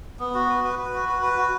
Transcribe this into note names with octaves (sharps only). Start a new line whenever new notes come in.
B3
F#4
B4
B4
B4
F#4
B4
B4
F#4